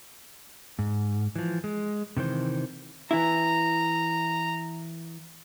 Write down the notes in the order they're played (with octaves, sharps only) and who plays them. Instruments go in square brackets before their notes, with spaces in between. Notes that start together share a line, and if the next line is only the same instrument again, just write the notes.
[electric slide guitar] G#2
E3 F3
G#3
C3 D#3 E3 C5
[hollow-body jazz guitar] E3 E4 [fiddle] A#5